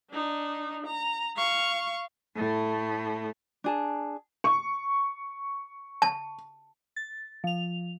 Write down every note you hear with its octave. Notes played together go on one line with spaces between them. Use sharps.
D4 D#4
A#5
F5 C#6
A2 A3
D4 G#4 A5
C#6
A5
A6
F3 F7